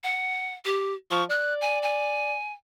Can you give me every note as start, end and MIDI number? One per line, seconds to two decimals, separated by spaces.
0.04 0.54 78
0.65 0.93 67
1.11 1.24 53
1.11 1.24 85
1.30 2.35 74
1.30 1.54 90
1.61 1.79 80
1.82 2.53 80